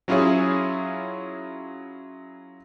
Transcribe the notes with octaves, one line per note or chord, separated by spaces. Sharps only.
F#3 C#4 E4 F4 G#4 C#5